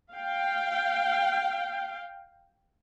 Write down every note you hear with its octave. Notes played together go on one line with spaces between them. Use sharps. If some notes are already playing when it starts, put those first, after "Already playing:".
F5 G5